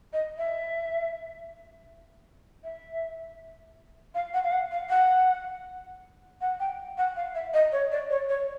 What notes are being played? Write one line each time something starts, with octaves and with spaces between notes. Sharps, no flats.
D#5
E5
E5
F5
F#5
F5
F#5
F5
F#5
F#5
G5
F#5
F5
E5
D#5
C#5
D5
C#5
C#5